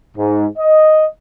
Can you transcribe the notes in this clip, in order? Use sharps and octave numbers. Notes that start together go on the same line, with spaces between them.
G#2
D#5